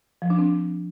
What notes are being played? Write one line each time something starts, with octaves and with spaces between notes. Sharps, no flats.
F3
D4
C4